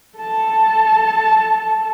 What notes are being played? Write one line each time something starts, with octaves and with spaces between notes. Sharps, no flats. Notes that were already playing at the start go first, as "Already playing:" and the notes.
A4 A5